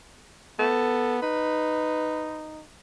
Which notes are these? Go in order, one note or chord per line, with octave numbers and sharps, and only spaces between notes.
B3 A4
D#4 B4